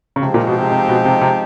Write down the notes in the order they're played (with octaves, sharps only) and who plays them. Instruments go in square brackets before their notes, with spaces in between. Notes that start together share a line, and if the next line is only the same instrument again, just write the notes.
[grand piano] C#3
[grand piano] C3 [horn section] F3 G#3 C4 D#4 G4
[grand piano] A#2
B2
C3
C3
B2
C3
C3